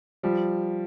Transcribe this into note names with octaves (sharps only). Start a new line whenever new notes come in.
F3 G3